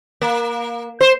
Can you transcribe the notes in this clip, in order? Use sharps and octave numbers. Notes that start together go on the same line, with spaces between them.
A#3
C5